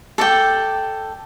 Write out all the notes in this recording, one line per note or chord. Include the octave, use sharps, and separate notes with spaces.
A4 D5 G5